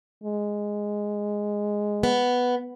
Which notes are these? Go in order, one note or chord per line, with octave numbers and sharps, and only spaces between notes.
G#3
B3